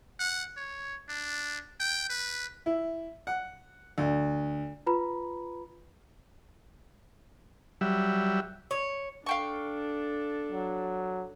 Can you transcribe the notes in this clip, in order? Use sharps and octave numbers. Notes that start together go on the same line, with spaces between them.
F#5
C#5
D4
G5
B4
E4
F#5
D2
F4 B4 A#5 B5
F#3 G3 E5
C#5
D4 A4 F5 G5 C#6
F#3